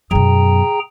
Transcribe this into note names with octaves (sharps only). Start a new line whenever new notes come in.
F#2 B2 G#4 G5 A#5